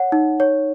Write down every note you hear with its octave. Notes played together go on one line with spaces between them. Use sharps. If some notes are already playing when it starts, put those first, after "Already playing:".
Already playing: C#5 F#5
D#4
C#5